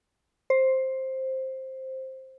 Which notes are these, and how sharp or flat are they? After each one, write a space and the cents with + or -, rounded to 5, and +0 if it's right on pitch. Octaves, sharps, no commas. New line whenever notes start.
C5 +10